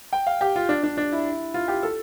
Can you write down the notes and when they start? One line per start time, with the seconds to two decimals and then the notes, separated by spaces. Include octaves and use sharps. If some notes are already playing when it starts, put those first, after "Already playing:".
0.13 G5
0.27 F5
0.41 G4
0.56 F4
0.69 D4
0.83 D4
0.97 D4
1.12 E4
1.54 F4
1.68 G4
1.83 A4